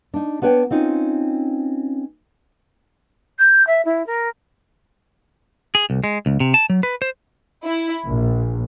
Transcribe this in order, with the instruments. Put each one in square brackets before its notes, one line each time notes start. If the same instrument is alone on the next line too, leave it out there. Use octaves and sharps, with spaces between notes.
[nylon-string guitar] D4 D#4
B3 D4 B4 C#5 G5
C4 C#4 D#4 F4
[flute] G6
E5
E4
A#4
[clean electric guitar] G#4
C2
G#3
C#2
C3
A5
F#3
B4
C5
[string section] E4
A#1